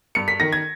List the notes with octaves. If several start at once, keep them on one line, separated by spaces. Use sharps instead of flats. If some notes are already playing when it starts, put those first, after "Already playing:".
G2 C#7
B6
D#3 A#6
G#6